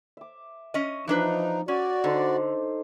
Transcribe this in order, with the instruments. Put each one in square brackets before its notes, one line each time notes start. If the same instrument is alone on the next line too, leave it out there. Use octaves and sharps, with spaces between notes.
[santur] E5 D6
[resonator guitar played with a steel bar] C#4 D#5
[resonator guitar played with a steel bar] E3 D4 B4 [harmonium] F3 D#4
[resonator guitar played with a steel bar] C#4 [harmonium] F#4 D5 [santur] C#5
[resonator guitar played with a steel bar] D3 [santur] D#4 A4 C5